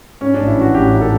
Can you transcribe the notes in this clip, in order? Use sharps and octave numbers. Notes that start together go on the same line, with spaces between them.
G#2 C#4
A1 D4
E4
E3 F#4
A1 G4
G#2
A4